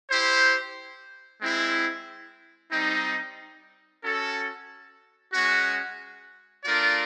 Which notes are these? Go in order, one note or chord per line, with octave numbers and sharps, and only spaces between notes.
E4 G4 C5
G#3 C4 E4
G3 C4 D#4
C#4 F#4 A4
G#3 C#4 F#4
A3 D4 F4 A#4 D5